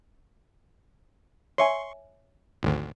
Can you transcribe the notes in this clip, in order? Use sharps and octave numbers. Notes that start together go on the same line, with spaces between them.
C#5 E5 G#5 C6 C#6
G#1 D2